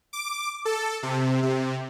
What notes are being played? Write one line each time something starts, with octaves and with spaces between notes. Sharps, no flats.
D6
A4
C3
C3